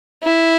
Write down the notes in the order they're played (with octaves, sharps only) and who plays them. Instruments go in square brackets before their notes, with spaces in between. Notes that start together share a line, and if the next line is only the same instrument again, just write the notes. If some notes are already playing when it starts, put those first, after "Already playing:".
[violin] E4